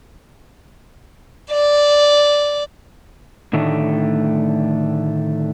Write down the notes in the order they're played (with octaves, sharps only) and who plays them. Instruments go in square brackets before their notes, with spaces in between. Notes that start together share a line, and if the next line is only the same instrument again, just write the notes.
[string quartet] D5
[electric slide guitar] A2 D3 D#3 A3